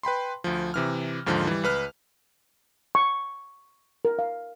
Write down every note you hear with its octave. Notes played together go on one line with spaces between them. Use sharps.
B4 G5 B5 C6
D2 F3
C3 E3 F6
D#2 G#2 D3 F3
E3 G3
C#2 B4 F6
C#6
A#4
F5